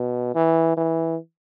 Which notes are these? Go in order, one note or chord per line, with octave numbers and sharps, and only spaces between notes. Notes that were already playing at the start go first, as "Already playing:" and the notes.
Already playing: B2
E3
E3